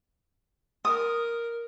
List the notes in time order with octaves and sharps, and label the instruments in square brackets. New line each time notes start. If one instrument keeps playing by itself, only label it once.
[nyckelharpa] A#4 [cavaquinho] D#6